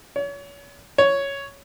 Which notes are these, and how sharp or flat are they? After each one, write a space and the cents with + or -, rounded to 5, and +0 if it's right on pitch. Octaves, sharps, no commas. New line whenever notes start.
C#5 +35
C#5 +5